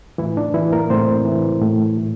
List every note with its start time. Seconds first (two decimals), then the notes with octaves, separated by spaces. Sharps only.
0.18 A2 E3 E4
0.37 D4
0.54 E3 E4
0.73 A#3 A#4
0.90 A2 C4 C5
1.25 E3
1.62 A2
1.98 A2